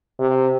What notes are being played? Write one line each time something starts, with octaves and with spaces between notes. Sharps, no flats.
C3